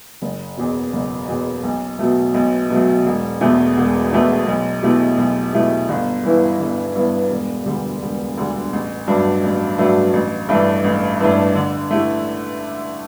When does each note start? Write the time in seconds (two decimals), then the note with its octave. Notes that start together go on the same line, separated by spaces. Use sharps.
0.22 F#1
0.57 E2 B2
0.93 F#1
1.28 E2 B2
1.63 B1
1.99 B2 F#3 A3
2.34 B1
2.70 B2 F#3 A3
3.06 E1
3.41 E2 B2 A3
3.77 E1
4.12 E2 B2 A3
4.47 B1
4.83 B2 A3 E4 G4
5.18 B1
5.53 B2 A3 E4 G4
5.89 G1
6.24 G2 E3 B3 E4
6.60 G1
6.96 G2 E3 B3 E4
7.30 E1
7.66 D2 D3 G3
8.02 E1
8.37 D2 D3 G3
8.73 A1
9.07 G2 F#3 A3 D4
9.43 A1
9.78 G2 F#3 A3 D4
10.13 A1
10.49 G2 E3 A3 D4
10.84 A1
11.20 G2 E3 A3 D4
11.55 D3
11.91 A3 E4 G4